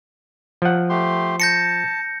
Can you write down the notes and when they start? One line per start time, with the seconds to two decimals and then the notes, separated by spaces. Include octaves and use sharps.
0.62 F3 F#5
0.90 A3 G4 C6
1.40 A5 G6 A#6 C#7